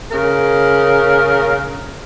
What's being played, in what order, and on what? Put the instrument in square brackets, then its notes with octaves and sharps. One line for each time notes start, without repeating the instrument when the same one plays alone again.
[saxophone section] C#3 A#4